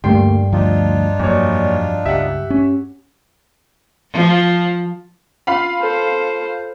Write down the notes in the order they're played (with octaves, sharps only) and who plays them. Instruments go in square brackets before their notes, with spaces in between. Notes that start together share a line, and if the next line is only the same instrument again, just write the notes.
[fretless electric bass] D2 A3 A#3 [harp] G2 G3 C7 [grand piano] G5 C6
[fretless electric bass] D2 F3 [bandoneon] D4 D#4 F4
[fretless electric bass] F2 F#3 [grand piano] A#2 C#5
[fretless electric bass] C#2 [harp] G4 [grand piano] E5 F#5
[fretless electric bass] C#4
[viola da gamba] F3
[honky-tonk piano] F4 F5 B5
[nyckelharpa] A4 C5